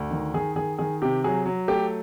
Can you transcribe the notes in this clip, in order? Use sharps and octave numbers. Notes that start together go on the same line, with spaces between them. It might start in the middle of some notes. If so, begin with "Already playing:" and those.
Already playing: D2
D#3
D#3 G#4
D#3 G#4
D#3 G#4
C3 G4
F#3 G#4
F#3
A3 G4